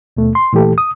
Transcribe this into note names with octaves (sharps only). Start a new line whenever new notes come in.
D#2 B2 A3
C6
A#2 E3 A3 G4 A4
D#6